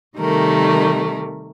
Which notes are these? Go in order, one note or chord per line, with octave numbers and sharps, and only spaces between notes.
C3 D#3 G3 A3 A#4